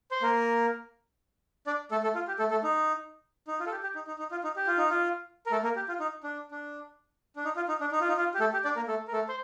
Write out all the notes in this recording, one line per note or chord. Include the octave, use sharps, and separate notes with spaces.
C5
A#3 A#4
D4 D5
A3 A4
A3 A4
F4
G4
A3 A4
A3 A4
D#4
D#4
F4
A4
G4
G4
D#4
D#4
D#4
F4
D#4
G4
F4
D#4
F4
A#4
A3 A4
A#3 A#4
G4
F4
D#4
D4
D4
D4
D#4
F4
D#4
D4
D#4
F4
D#4
F4
G4
A3 A4
G4
D4 D5
A#3 A#4
A3 A4
A#4
A3 A4
C5